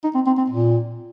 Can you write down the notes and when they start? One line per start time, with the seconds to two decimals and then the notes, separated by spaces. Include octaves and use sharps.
0.04 D#4
0.15 C4
0.27 C4
0.38 C4
0.50 A#2